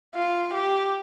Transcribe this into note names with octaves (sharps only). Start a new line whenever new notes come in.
F4
G4